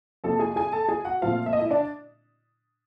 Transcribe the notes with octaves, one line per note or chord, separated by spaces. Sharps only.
F2 C3 F3 A#3 A4 A5
G#4 G#5
G#4 G#5
A4 A5
G#4 G#5
F#4 F#5
A#2 F3 A3 C4 F4 F5
E5
D#5
E4 E5
D4 D5